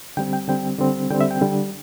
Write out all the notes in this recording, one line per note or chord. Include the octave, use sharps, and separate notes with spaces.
D3 G3 C4 G5
G5
D3 G3 C4 G5
D3 G3 C4
D3 G3 C4 G5
E5
G5
D3 G3 D4